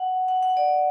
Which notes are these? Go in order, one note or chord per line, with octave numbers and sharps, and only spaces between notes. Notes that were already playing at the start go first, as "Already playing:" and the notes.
Already playing: F#5
F#5
F#5
D5